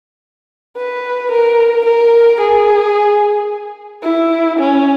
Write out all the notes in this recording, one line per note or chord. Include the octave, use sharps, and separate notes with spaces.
B4
A#4
A#4
G#4
E4
C#4